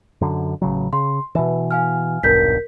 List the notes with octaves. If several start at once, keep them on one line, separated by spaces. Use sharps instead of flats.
F#2 D3
A1 C#3 F#3
C#3 C6
B2 E3 B4 E5
F5 G#5 F6
D#1 B1 G2 A#4 G6 B6